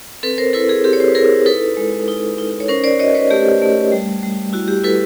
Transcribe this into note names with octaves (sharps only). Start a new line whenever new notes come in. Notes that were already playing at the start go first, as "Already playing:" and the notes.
C4 A4 B4
A#4 C5
E4 A4 B4
G#4 A#4
C4 G4 A4
C#5
C5
B4
E4 G#4 A#4
D#4 A4 B4
G#3
D#4
D#4
C#5
C#4 A#4 C5
C5 D5
F#4 C#5 D#5
B4 C#5
A3 G4
A3
G3
G3
E4 F#4
G4
E4 A4 B4